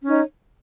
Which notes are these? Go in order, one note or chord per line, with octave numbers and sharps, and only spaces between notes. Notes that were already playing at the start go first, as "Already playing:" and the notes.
C#4 D#4 C#5